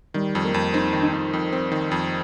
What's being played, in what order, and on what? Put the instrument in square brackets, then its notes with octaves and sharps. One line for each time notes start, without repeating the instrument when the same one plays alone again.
[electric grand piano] D#3 [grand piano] G3
[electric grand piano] F2
[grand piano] A#3
[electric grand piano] F2
[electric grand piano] C4 [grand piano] D#4
[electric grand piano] D#3
[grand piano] D#4
[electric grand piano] F2
F2
C4
D#3
F2